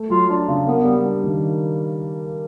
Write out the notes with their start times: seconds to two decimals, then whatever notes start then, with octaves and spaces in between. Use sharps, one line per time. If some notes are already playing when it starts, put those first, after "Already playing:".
Already playing: A3
0.10 F#3 F4
0.30 D4
0.48 C#3
0.67 A#3 B3
0.85 G3
1.04 D4
1.24 D#3